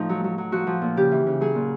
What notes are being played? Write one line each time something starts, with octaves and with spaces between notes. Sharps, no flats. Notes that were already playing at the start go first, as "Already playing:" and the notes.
Already playing: A2 F3 D#4
F#3
F#3
F#3
F3 F#4
F3
A#2
C#3 G4
E3
C#3
F#3 G#4
A#2